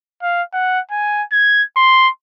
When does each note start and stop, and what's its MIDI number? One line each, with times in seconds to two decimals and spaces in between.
0.22 0.42 77
0.53 0.80 78
0.91 1.23 80
1.32 1.63 92
1.76 2.10 84